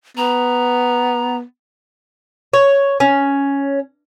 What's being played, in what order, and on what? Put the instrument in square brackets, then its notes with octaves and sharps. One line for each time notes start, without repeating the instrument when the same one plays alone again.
[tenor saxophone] B3 [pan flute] A#5
[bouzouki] C#5
C#4